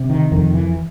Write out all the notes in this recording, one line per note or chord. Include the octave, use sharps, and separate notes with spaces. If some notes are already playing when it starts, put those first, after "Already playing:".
Already playing: C3
D#3
F2 D#3
E3